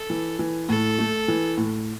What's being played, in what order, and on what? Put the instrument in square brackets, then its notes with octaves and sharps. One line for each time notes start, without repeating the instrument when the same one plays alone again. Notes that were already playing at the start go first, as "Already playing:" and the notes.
Already playing: [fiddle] A4
[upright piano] E3
E3
[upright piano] A2 [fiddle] A4
[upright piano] A3
E3
A2